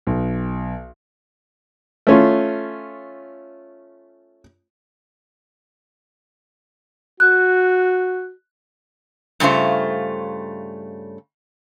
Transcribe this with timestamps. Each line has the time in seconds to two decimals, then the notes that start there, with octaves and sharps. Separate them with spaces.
0.07 B1
2.07 A3 C#4 F4
7.20 F#4 F#6
9.40 G2 C#3 A3 F4 C5